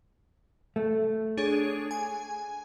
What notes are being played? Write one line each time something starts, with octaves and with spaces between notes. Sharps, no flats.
A3
D4 G#4 C#5
G#5